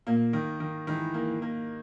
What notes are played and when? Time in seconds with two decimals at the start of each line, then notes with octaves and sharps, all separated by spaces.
0.07 A#2 A#3
0.33 D#3
0.60 D#3
0.87 D#3 E3 G#3
1.14 A#3
1.42 A#3